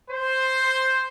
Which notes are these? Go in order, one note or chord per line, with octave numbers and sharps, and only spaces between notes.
C5